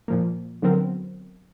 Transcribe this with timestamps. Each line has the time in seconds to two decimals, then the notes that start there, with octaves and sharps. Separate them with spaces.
0.08 A#2 F3 A#3
0.62 D3 F#3 B3 C4 A#4